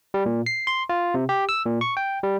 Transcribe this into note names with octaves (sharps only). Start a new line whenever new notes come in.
G3
A#2
C7
C6
F4
C3
G4
E6
A#2
C#6
G5
G3